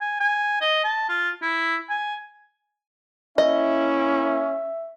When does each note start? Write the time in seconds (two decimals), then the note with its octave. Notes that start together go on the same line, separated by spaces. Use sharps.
0.01 G#5
0.20 G#5
0.61 D#5
0.84 A5
1.09 F4
1.42 E4
1.90 G#5
3.38 A#3 C#4 E4 D#5 E5